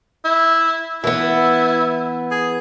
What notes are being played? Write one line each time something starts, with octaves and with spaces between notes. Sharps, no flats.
E4
E3 B3 E4
G#4